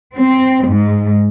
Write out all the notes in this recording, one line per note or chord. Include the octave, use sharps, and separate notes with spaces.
C4
G#2